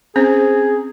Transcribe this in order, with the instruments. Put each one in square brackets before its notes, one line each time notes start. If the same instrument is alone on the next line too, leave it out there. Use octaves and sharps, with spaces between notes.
[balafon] C4 C#4 C5 [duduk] G#4